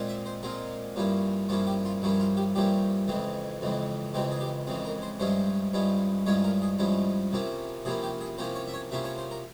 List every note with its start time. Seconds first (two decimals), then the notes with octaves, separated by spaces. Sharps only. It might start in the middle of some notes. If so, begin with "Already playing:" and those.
Already playing: A#2 G#3 C4 F4
0.08 E5
0.26 C5
0.43 A#2 G#3 C4 F4 A#4
0.96 G2 F3 A#3 C#4 E4
1.49 G2 F3 A#3 C#4 E4 F4
1.67 G4
1.85 F4
2.02 G2 F3 A#3 C#4 E4
2.20 F4
2.37 G4
2.55 G2 F3 A#3 C#4 E4 G4
3.08 F2 C#3 E3 G#3 C4
3.61 F2 C#3 E3 G#3 C4
4.14 F2 C#3 E3 G#3 C4 G4
4.32 G#4
4.41 G4
4.67 F2 C#3 E3 G#3 C4
4.85 A#4
5.02 C5
5.20 G2 F3 G#3 C#4 E4 C5
5.73 G2 F3 G#3 C#4 E4
6.26 G2 F3 G#3 C#4 E4 C#5
6.44 A#4
6.62 G#4
6.79 G2 F3 G#3 C#4 E4
7.32 C3 F3 A#3 C#4 E4
7.85 C3 F3 A#3 C#4 E4 G#4
8.03 G4
8.21 G#4
8.38 C3 F3 A#3 C#4 E4 C5
8.55 C#5
8.67 E5
8.74 C#5
8.91 C3 F3 A#3 C#4 E4 E5
9.04 C#5
9.18 C5
9.31 A#4